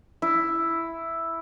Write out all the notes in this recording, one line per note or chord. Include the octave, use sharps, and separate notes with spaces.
E4